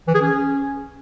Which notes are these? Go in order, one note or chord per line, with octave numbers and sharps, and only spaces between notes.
E3
G#4
C#4